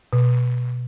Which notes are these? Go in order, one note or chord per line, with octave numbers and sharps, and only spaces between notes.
B2